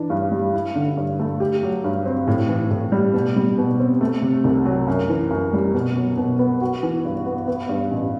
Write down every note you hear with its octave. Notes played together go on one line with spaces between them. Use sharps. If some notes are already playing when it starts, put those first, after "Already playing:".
Already playing: E3 D4
G2
G3
E4
D3
G2
A3
G4
F#3
G2
C4
A2
E3
A2
G3
B2
G3
B2
C4
A3
C3
C2
F#3
F#2
E3
F#2
G3
B2
F#3
B2
B3
F#4
E3
G2
B3
B3
G2
A1